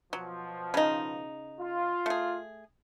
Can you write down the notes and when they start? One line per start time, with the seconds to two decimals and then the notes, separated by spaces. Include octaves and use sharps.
0.13 B2 F3 F#3
0.74 C#3 D#4
1.60 F4
2.06 A3 G#4